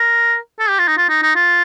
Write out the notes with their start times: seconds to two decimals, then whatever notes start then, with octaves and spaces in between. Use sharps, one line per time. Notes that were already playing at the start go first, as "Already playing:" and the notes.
Already playing: A#4
0.59 A4
0.69 G4
0.78 F4
0.87 D#4
0.97 F4
1.09 D#4
1.22 D#4
1.35 F4